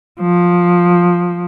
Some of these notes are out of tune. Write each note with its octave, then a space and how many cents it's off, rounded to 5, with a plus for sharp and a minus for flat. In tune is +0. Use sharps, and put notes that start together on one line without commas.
F3 +10